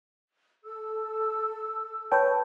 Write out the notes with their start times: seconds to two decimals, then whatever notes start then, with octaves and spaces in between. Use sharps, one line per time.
0.64 A4 E6
2.12 B4 C#5 G5 A5 G6